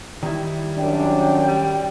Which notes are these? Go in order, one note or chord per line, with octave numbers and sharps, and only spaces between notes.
D#3 G3 E4
F#2 D4 G5
G3